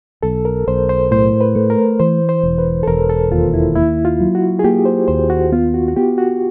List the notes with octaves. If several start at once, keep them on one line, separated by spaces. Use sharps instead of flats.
B1 A4
A#4
B1 C5
C5
A2 C5
B4
A3
A#4
E3 C5
C5
E1
B4
A4
E1 A#4
A4
D#2 F4
E4
A#3 E4
F4
F#3
F#4
G#4
A#3 G4
C5
D#2 C5
F#4
B3 F4
F#4
F#4
B3 G4
F#4